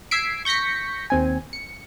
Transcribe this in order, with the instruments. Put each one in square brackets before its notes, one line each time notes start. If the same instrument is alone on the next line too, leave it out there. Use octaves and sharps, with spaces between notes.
[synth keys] E6 G#6 B6 C7 D7
C#6 G6 A#6 B6 C#7
D#2 C4 G#5
C#7